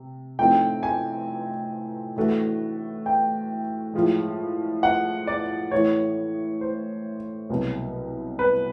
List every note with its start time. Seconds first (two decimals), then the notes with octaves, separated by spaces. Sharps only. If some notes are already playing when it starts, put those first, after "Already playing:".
Already playing: C3
0.39 A2 F3 A3 C4 D#4 G5
0.83 G#5
2.16 A2 E3 A3 D4 F#4
3.06 G5
3.94 A2 F3 G#3
4.83 F#5
5.27 D5
5.72 A2 E3 A3 C#5
6.61 C5
7.50 C2 B2 F#3
8.39 B4